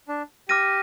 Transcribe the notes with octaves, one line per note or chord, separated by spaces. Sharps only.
D4
G4 D6 F6 A#6 D#7